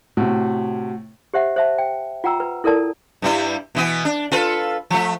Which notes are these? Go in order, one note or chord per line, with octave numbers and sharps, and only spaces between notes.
A2 C3 F#4
G4 C5 E5 F#5
C5 E5 A5
G5
F4 F#5 G5 A#5 E6
B4
E4 A4 A#4 D5 A5
G2 G3 E4
B2 E3 B3
D4
F4 A4 B4
F3 A3